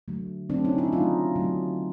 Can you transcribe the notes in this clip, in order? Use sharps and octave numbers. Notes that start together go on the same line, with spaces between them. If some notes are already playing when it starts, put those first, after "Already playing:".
D3 F#3 A3
D3 F#3 A3 C4 D4
C#4 D#4
D4 E4
D3 F#3 A3 D#4 F4
D3 F#3 A3